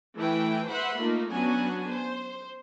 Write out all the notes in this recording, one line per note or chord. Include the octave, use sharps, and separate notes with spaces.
E3 A3 E4 B4 G5
B4 C5 E5 F#5 B5 C6
A3 A#3 D#4 F4
F#3 B3 C#4 D4 F#4 G#5
C5